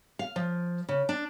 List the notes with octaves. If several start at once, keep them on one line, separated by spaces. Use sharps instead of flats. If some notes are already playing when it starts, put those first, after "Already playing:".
F5
F3
C#3
D4